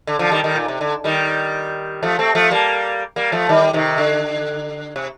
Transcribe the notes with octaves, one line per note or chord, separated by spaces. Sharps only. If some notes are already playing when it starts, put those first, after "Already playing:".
D3
D3 F3
D#3 G3
D#3 G3
A#2
C3
D3
D#3 G3
F3 A3
A3 C4
F3 A3
G3 A#3
G3 A#3
F3 A3
D#3 G3
C3 D#3
D3
C3